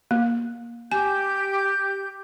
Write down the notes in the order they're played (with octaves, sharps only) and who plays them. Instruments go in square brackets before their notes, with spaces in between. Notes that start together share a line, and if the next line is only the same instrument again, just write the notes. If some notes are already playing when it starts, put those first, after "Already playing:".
[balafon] A#3
[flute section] G4 G6 [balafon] G#5